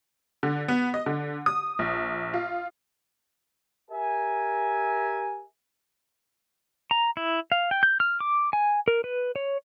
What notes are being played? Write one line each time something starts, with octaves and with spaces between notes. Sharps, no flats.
D3
B3
D#5
D3
D#6
A#1
F4
G4 A#4 E5 G#5
A#5
E4
F5
G5
G6
F6
D6
G#5
A#4
B4
C#5